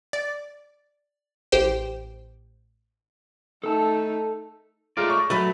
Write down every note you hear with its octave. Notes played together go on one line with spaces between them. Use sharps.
D5
A1 G4 C5 G5
A3 D#4 A4 A5
G#3 A3 F4 A#4 D5
C#6
F#3 A3 F#4 B4 A6